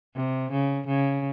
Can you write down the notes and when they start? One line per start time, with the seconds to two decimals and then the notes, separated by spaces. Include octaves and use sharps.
0.15 C3
0.52 C#3
0.87 C#3